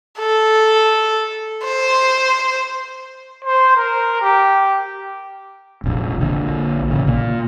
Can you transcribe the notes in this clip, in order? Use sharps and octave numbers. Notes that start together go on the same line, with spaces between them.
A4
C5
C5
A#4
G4
F1 A#1
A#1 D3
A1 C#3
A#2